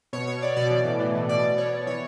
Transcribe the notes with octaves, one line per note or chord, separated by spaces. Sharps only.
B2 C#5
B2 C#5
B2 D5
B2 D5
E3
A2
E3
A2
B2 D5
B2
B2 C#5
B2
E3 C#5